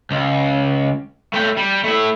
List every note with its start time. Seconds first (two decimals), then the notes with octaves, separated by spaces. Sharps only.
0.11 C#2
1.34 A3 G5
1.57 G3
1.84 A3 E4